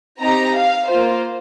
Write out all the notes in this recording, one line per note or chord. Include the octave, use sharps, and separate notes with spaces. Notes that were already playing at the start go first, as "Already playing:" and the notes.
C4 D#4 G4 A#5
F5
A#3 F4 C5